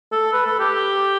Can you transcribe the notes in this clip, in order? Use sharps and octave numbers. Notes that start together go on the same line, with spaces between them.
A4
B4
A4
G4